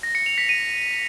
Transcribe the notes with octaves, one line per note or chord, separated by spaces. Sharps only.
A#6
C#7
F7
B6
D#7